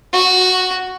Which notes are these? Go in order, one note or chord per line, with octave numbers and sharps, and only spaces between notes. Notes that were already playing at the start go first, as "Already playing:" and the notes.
F#4